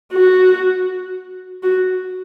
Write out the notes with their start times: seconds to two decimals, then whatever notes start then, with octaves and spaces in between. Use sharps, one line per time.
0.13 F#4
1.63 F#4